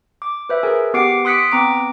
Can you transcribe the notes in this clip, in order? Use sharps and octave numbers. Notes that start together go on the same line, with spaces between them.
D6
B4 C5 E5
G#4 A#4 G#5
B3 G4 F#5 D6 C7 D7
C6 D#6 F#6 B6 C#7 D7
B3 C4 A#5 D6 D7